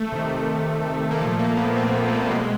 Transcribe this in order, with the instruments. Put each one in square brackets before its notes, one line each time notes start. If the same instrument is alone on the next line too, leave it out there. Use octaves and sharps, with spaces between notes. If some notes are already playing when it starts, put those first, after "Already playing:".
Already playing: [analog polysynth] A3
C3 D#3
A#3
A#2 F3 A3
A3
A#3
B3
C4
B3
A3
A#3
G3
B2 G#3